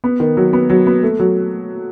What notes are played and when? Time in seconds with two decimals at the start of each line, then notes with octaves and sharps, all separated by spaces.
0.04 B3
0.20 D#3
0.37 F#3
0.53 B3
0.70 F#3
0.87 B3
1.03 A3
1.19 F#3